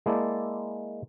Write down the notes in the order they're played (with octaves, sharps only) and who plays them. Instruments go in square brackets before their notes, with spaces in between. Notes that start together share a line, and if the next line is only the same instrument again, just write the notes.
[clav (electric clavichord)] G#3 A#3 E4 D5 A5